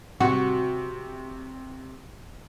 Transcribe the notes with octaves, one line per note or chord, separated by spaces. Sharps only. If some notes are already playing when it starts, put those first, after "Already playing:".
C3 F#4 C#6